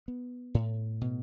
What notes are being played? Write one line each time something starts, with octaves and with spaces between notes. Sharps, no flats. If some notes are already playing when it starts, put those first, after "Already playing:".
B3
A2
B2